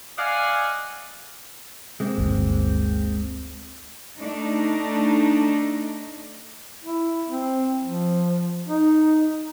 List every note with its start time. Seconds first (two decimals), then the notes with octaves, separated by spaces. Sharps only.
0.18 D5 D#5 F5 F#5 G#5
2.00 G#3 A#3 C4
2.18 G1 D2
4.19 A3 D4 D#4
6.84 E4
7.28 C4
7.83 F3
8.67 D#4